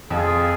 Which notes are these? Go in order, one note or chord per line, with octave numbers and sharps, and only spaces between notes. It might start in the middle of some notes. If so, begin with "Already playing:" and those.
F2 F4 G#4